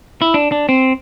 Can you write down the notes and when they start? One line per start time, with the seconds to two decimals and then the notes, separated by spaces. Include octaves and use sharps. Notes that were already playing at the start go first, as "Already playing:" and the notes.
0.22 E4
0.34 D4
0.52 D4
0.69 C4